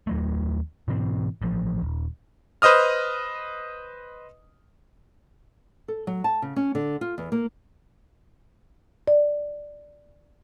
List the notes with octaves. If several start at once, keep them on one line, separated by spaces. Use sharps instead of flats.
D#2 F#3 A3
G#2 B2 E3 C4
A1 F3
D#1
B4 C5 D#5 D#6 F6
A4
F#3
A5
C#3
C#4
D3
F4
E2
A#3
D5